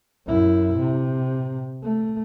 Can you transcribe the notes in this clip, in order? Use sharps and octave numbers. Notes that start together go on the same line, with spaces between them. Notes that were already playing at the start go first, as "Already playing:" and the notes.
F#2 E4
C3
A3